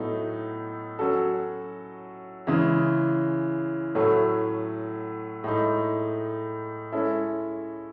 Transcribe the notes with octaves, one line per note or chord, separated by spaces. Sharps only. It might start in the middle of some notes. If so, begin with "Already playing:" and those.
Already playing: A2 F#3 B3 D#4 A4
F#3 C#4 F#4 A4
C#3 E3 G#3
A2 F#3 A3
A2 G#3 D#4
G#3 C#4 E4 A4